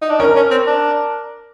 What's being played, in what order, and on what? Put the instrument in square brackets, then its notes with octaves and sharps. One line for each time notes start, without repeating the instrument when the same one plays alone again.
[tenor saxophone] D#4
D4
[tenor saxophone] C#4 [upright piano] A#4
[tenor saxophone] C#4
C4
D4